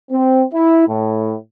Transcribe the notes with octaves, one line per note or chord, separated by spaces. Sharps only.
C4
E4
A2